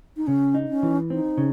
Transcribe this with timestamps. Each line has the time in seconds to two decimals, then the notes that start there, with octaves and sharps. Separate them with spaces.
0.17 D#4
0.27 C#3 C#4
0.54 D#4
0.69 C#4
0.83 E3
1.10 C4 D#4
1.38 C#3